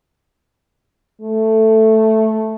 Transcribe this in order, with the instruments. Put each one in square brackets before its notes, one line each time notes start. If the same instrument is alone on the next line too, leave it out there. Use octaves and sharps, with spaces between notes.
[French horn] A3